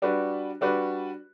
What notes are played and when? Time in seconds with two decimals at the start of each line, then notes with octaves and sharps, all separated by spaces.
0.02 G3 D4 F#4 B4
0.61 G3 D4 F#4 B4